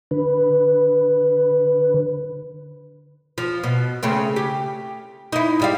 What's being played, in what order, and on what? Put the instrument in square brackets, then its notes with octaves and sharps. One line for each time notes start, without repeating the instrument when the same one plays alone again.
[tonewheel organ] D3 B4
[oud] F3
B2
C#3 A3 C4
G4
D#4 E4
G#2 G3 F5